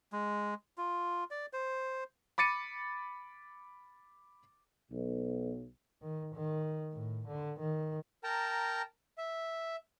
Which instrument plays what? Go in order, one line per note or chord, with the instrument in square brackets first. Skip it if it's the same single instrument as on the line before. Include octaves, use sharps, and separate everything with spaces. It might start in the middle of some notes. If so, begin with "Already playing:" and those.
[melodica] G#3
F4
D5
C5
[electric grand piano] B5 D6 A6 C#7 D#7
[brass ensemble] B1
[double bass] D#3
D#3
A2
D3
D#3
[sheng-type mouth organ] A#4 G5 A5 A#5
E5